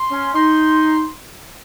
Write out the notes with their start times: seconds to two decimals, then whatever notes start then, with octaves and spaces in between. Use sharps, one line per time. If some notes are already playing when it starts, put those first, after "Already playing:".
Already playing: C6
0.11 C#4
0.34 D#4 C6